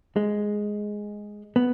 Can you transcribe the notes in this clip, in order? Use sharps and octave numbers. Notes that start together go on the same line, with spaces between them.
G#3
B3